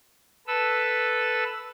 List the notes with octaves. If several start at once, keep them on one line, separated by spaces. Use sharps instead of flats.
A4 B4 E6